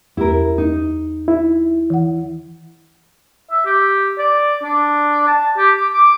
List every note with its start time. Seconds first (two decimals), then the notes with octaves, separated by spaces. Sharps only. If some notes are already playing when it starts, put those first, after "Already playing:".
0.17 E2 E4 G4 A#4
0.58 D#4
1.28 E4
1.90 E3 F#5
3.51 E5
3.65 G4
4.18 D5
4.63 D4
5.27 A5
5.57 G4
5.76 D6
5.93 D6